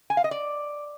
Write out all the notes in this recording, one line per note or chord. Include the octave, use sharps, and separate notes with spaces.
G#5
F5
D#5
D5